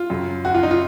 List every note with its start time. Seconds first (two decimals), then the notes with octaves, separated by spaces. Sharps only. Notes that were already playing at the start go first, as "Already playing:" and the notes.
Already playing: F4
0.10 F#2 C#3 F#3
0.45 F#4
0.54 F4
0.63 D#4
0.71 F4